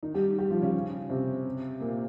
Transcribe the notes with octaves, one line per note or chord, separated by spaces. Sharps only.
D#3 D#4
G3 G4
G3 G4
F3 F4
C#3 C#4
C3 C4
A#2 A#3